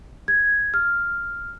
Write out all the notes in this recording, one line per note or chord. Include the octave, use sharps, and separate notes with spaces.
G#6
F6